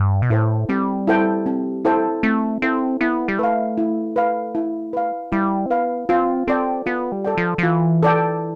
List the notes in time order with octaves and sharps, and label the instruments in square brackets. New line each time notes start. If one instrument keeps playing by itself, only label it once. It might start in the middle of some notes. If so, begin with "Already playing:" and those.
Already playing: [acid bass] G2
B2
[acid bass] A2 [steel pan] E4 A4 C5 G5
[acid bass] G3 [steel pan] C4
[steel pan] E4 A4 C5 G5
C4
E4 A4 C5 G5
[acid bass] A3 [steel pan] C4
[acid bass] C4 [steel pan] E4 A4 C5 G5
[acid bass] B3 [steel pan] E4
[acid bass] G3
[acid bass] A3 [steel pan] B4 F5
[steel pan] E4
B4 F5
E4
B4 F5
[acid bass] G3 [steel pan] E4
[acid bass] C4
[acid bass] B3 [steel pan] B4 F5
[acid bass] C4 [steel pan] F4
[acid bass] C4 [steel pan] A4 D5 G5
[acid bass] B3 [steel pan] F4
[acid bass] G3
[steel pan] A4 D5 G5
[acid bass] F3
F3
[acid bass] E3 [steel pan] F4
[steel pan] A4 D5 G5